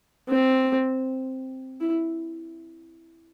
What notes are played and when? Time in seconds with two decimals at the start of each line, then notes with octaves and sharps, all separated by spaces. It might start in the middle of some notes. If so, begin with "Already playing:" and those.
0.29 C4
1.80 E4